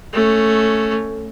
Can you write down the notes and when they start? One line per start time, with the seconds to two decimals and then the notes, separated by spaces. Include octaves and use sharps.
0.13 A3 C#4